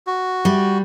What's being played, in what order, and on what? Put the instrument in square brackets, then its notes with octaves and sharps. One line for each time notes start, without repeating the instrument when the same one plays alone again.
[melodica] F#4
[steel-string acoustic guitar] G3